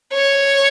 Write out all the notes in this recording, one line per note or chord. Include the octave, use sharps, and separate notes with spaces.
C#5